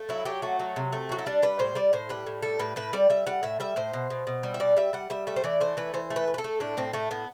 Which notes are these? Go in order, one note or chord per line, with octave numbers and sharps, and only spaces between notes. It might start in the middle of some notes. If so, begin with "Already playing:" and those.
Already playing: A3
F#3 E4
F#3 G4
A3 F#4
F#3
C3
A3
F#3 F#4
E4
G3 D4
G3 B4
A2 C5
G3 D5
A2 C5
G3 B4
A2
G3 A4
A2 B4
A2 B4
G3 D5
G3 E5
G3 F#5
A2 E5
G3 E5
A2 C5
B2
B2
B2
G3
E5
B2 D5
G3 E5
G3 F#5
G3 E5
A3 E5
C5
E3 D5
A3 C5
E3 B4
E3 C5
A3
B4
A3
B4
A4
A3
A2 D4
A2 C4
A2 A3
A2 B3